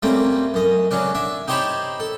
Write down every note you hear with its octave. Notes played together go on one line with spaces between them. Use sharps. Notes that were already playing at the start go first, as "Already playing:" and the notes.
G3 A3 A#3 C4 C#4
F#2 D#5
C#3 F#3 C#4 D4
D4 E5
D#4 G4 C5 C#5 A5 B5
A4